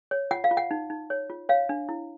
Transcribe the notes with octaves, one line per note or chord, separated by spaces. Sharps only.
C#5
F4 F#5
F5
F4
F#5
D#4
D#4
C#5
F4
C#5 F5
D4
E4